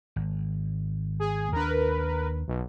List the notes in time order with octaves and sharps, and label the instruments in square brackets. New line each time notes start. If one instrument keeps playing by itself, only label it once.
[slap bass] G#1
[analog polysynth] G#4
[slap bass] D#2 D4 [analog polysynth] A#4 B4
[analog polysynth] B1